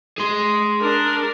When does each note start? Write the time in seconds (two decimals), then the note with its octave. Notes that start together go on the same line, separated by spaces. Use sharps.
0.19 G#4 C6
0.81 D4 A#4